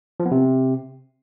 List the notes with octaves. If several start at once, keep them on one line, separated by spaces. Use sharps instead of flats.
F3
B3
C3